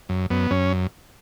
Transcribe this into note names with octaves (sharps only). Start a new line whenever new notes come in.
F#2
F#2 B3
F#2 C#4